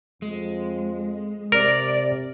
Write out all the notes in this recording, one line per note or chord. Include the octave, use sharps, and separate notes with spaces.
F2 G#3
C3 A#4 D5